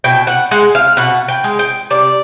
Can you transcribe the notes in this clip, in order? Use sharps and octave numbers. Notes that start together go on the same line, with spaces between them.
B2 G5
F#5
G#3 F#5
F5
B2 F#5
G5
G#3
G5
C3 D5